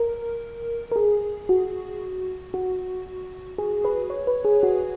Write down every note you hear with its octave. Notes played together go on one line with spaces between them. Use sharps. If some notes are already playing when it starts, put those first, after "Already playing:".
Already playing: A#4
A#4
G#4
F#4
F#4
G#4
B4
C#5
B4
G#4
F#4